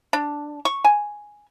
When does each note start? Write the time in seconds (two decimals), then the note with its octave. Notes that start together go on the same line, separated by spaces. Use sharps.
0.13 D4
0.65 C#6
0.84 G#5